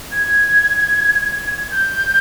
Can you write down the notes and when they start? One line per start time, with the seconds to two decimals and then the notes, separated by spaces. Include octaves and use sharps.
0.11 G#6
1.72 G6